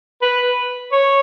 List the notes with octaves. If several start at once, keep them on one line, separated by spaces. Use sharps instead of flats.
B4
C#5